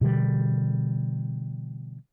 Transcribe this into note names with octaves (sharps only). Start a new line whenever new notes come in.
B2 D3 E3 G3